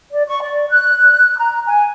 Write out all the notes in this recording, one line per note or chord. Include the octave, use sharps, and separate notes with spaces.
D5
C#6
D5
F#6
A#5
G#5